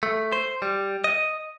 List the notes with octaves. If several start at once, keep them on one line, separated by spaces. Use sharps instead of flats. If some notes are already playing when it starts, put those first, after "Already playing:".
A3
C5
G3
D#5